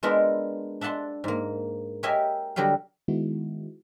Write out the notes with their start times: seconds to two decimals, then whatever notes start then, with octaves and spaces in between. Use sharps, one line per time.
0.03 G#3 B3 D4 F4 A#4 E5
0.81 D4 E5 F#5 A5 C6
1.24 G#2 A#3
2.03 G4 A#4 C#5 D#5 E5 G#5
2.56 D3 F#3 G3 G4 F5
3.08 D#3 G#3 B3 D#4 E4 F#4